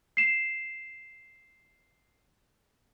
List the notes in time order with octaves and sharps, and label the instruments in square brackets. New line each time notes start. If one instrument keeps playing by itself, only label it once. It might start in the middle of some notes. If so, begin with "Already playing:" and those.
[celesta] C7 E7